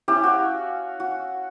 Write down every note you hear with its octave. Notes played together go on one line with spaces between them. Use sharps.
C#4 E4 G4
F#4 E5 F5
F#4